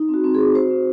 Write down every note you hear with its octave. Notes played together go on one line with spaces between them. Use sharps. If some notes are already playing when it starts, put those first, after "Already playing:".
Already playing: D#4
C4 F#4
C4
G#4
F#4
F#4 C5
C4